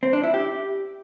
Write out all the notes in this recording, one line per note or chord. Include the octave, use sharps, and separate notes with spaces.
C4
D4
E4
G4